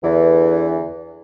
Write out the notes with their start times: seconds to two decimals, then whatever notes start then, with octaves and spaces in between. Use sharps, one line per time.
0.02 E2 D3 E3